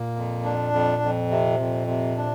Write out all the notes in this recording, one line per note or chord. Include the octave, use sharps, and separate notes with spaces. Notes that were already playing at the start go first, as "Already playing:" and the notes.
Already playing: A#2 A#3
F2
D4
F2
F2
C3
F2
C3
D4